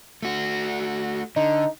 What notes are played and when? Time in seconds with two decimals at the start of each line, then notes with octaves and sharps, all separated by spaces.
0.23 A3 F#4
1.36 D3 D#4